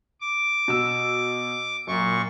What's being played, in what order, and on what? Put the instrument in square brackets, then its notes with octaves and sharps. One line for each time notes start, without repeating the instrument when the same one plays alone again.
[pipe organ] D6
[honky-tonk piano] B2 E6
[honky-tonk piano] F#2 [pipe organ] A#2 C#6